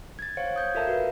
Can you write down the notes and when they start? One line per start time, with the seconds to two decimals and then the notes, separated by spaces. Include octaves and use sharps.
0.19 G#6 A6
0.37 C5 C#5 F5 F#5 C#7 D7
0.56 D#6 G6 G#6
0.74 F4 A4 A#4 E5 F5 A5
0.87 F#4 B4